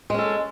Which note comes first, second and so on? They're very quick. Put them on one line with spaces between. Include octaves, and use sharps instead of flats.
G#3 C#4 A4